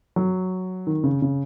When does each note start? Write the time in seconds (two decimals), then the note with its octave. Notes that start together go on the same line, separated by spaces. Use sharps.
0.16 F#3
0.87 D#3
1.04 C#3
1.22 C#3